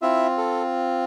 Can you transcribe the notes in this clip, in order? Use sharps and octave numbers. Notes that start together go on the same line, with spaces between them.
C4 E4 F4 E5
A4